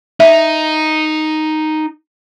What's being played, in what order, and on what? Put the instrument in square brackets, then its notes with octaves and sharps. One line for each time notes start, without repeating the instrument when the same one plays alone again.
[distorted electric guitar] D#4 [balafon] E5